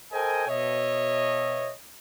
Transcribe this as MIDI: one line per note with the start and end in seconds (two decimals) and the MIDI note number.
0.12 0.45 69
0.12 0.45 70
0.12 0.45 72
0.12 0.45 75
0.12 0.45 79
0.12 0.45 80
0.48 1.73 47
0.48 1.73 73
0.48 1.73 75
0.48 1.73 76